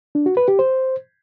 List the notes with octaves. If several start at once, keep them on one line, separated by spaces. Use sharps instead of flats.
D4
F#4
B4
G4
C5